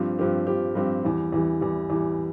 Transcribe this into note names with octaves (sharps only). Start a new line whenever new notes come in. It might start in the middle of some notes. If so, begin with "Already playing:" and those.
Already playing: G2 F3 C4 G4
G2 F3 C4 G4
G2 F3 C4 G4
G2 F3 C4 G4
E2 E3 G3
E2 E3 G3
E2 E3 G3
E2 E3 G3